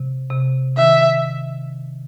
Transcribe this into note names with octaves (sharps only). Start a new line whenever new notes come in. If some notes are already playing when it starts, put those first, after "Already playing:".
Already playing: C3
C3
D#3 E5